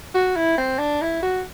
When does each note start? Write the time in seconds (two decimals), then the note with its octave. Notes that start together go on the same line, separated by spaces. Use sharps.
0.14 F#4
0.36 E4
0.58 C4
0.79 D4
1.01 E4
1.22 F#4